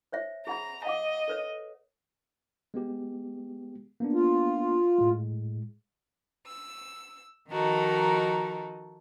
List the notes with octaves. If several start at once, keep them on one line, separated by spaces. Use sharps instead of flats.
C5 C#5 E5
G#4 F#5 A#5 B5
D#5 F5 F#5 D6
A4 B4 C#5
G#3 B3 G4
A#3 B3 D4
F4
A2 G#3
E6
D#3 F3 D#4 F#4 A4 A#4